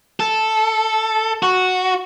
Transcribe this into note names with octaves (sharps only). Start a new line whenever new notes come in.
A4
F#4